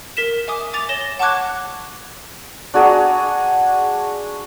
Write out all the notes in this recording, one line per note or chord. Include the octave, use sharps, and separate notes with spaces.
A#4 B6 E7
E5 G#5 D6 D#6
G#5 D6 A6 F7
C#5 A#6 E7 G7
F#5 A5 C#6 D6 F#6 G#6
D4 F#4 G#4 A#5